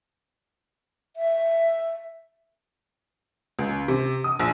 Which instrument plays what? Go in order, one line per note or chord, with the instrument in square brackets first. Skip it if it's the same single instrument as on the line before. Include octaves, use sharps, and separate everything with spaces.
[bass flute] E5
[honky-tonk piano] C#2
C3
D#6
A#1